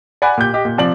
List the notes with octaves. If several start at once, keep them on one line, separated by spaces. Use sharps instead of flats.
D5 F#5 G#5 B5 F#6
A#2 G4 G6
G4 D#5
A#2
C3 F3 D5 F#7